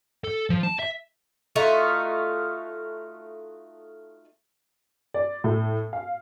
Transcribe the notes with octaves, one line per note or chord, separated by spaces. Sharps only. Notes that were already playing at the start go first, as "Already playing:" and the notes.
A4
F3
A5
E5
A3 D#4 F4 F#4
D5
A2
F5